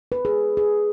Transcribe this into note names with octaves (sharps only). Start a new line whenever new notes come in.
B4
G#4
G#4